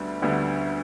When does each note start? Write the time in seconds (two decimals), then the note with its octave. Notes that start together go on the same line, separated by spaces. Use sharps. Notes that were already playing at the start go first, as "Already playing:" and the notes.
Already playing: D2 D3 G3 B3
0.22 D2 D3 G3 B3